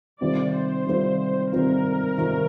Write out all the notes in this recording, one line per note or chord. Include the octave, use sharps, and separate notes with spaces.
C3 D#3 G3 C4 F4 D5
C5
C3 D#3 G3 C4 F4
C3 D#3 G3 C4 F4 A#4
C3 D#3 G3 C4 F4